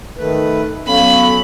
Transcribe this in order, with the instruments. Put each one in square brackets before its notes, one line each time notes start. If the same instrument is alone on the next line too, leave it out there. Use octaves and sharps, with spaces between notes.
[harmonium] D#3 A3 B4
[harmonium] F#3 C#4 [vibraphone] B3 A4 F5 [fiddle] B5